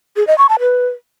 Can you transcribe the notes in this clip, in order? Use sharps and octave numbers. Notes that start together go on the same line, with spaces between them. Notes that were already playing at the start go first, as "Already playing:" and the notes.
G#4
D#5
C#6
A5
B4